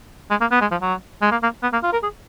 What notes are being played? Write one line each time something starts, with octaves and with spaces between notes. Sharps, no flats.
G#3
A#3
B3
G#3
F3
F#3
G#3
A#3
A#3
B3
A#3
F4
A#4
G#4